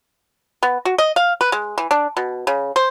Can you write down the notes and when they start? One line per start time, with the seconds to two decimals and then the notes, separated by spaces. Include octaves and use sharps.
0.63 B3
0.85 F#4
0.98 D#5
1.16 F5
1.41 B4
1.52 G#3
1.78 E3
1.91 D4
2.17 B2
2.47 C#3
2.76 C5